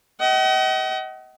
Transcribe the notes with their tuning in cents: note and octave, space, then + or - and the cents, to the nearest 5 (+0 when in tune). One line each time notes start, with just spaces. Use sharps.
D#5 +30 F#5 +45